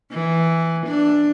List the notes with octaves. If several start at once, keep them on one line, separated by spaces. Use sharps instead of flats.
E3
D4